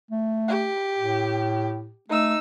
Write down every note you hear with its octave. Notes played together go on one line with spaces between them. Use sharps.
A3
G4
A2
A3 D#4 E6